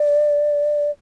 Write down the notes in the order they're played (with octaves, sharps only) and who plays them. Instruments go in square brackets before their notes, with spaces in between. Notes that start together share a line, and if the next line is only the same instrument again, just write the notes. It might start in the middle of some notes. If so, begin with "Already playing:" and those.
Already playing: [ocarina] D5